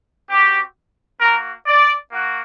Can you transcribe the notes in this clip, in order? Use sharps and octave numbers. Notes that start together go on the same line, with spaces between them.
C4 F#4 G4
A#3 F#4 A#4
D5
A#3 F#4